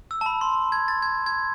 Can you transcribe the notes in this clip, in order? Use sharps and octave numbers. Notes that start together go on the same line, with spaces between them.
E6
A5
B5
C6
G#6
A6
G#6
G#6